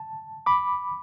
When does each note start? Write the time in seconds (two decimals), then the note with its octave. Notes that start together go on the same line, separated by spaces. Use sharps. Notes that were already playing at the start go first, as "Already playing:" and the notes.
Already playing: A5
0.46 B5 D6